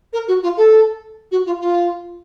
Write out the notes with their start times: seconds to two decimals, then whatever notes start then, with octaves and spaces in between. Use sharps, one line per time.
0.12 A#4
0.27 F#4
0.42 F4
0.57 A4
1.31 F#4
1.46 F4
1.60 F4